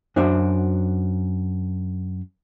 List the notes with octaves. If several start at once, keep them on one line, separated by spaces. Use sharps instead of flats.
F#2 D4 F#4 C5 E5